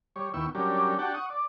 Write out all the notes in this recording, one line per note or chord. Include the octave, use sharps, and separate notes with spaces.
G3 C#5
D#2 B3 E4 G5 C#6 E6
F#3 G3 C#4 D4 G4 A#4
D4 F#4 G4 F#5 G5 A5
F#5 C#6 D#6
D5